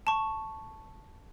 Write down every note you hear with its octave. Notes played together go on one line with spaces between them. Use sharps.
A5 C#6